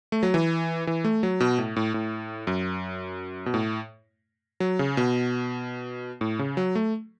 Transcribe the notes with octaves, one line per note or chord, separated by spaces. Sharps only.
A3
F#3
E3
E3
A3
F#3
B2
A2
A2
A2
F#2
B2
A2
F#3
C#3
B2
A2
C#3
F#3
A3